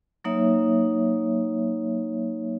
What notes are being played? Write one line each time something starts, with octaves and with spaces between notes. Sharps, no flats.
F#3 A#3 D#4 C#5 E5